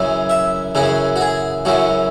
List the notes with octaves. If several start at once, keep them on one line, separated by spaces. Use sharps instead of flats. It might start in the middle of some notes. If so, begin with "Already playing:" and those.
Already playing: F#2 C#3 E3
E5
F#2 C#3 E3 G#4
F#4
G#4
F#2 C#3 E3 F#4